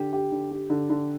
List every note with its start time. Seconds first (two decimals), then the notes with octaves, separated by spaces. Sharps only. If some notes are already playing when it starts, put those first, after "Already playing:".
Already playing: D3 G4
0.13 G4
0.32 D3
0.51 G4
0.70 D3
0.90 D3